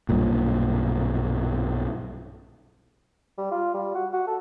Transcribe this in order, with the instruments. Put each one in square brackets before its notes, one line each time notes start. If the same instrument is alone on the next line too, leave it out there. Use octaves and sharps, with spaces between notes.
[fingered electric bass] B1 G2 A#2
[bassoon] G3
F4
G3
F#4
F#4
A4